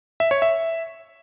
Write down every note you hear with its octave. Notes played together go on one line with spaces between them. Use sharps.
E5
C#5
E5